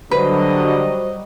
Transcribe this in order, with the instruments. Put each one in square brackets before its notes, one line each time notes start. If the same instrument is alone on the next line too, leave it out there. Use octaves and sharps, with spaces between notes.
[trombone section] D3 [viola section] F#3 G3 D#5 [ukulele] B4 [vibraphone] C5